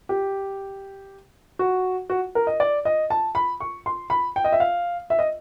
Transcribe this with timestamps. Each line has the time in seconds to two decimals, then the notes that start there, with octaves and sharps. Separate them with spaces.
0.09 G4
1.59 F#4
2.10 F#4
2.35 A#4
2.47 D#5
2.60 D5
2.85 D#5
3.10 A5
3.35 B5
3.60 C#6
3.86 C6
4.10 B5
4.36 G5
4.44 D#5
4.52 E5
4.60 F5
5.10 E5
5.19 D#5